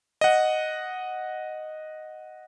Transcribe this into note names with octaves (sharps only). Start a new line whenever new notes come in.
D#5 F#5